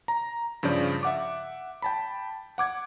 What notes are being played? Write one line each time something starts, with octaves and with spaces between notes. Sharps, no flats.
A#5
G2 C#3 F3 D5 G6
E5 F#5 D6
G5 A5 B5
F#5 D6 G#6